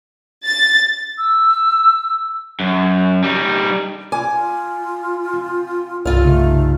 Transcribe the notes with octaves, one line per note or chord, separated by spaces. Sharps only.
A6
E6
F#2
G3 D#4
F4 G#5 D6 F6
C4
C2 G2 F4 A4 F5
C#3 A3 D#4